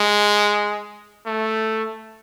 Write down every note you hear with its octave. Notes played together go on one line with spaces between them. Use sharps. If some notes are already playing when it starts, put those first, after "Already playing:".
Already playing: G#3
A3